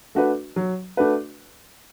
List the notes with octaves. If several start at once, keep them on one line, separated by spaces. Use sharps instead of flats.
A3 D4 F#4 B4
F#3
A3 D4 F#4 B4